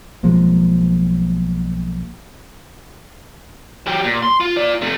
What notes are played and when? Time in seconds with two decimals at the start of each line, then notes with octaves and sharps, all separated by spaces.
0.23 B1 F3 G#3 A#3
3.87 F#3 G4
4.04 A#2
4.23 C6
4.40 F4
4.57 F4 D5
4.82 C3 A3